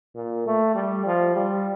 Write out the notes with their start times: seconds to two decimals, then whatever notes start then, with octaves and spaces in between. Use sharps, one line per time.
0.15 A#2
0.47 A3
0.75 G3
1.06 F3
1.36 G3